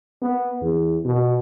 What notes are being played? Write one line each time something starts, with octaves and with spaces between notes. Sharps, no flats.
B3
E2
B2